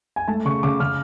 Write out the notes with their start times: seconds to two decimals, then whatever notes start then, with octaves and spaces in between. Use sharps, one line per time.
0.16 G#5
0.28 A3 A5
0.45 C#3 C#6
0.63 C#3 D6
0.80 C#3 F6